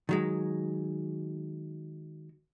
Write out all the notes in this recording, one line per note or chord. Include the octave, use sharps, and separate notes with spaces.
D#3 F#3 G#3